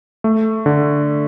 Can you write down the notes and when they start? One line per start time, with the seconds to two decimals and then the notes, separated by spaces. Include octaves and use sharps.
0.24 A3
0.66 D3